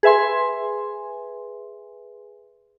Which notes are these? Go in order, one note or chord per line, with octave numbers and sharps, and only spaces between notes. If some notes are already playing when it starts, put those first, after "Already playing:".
G#4 B4 E5 G#5 C6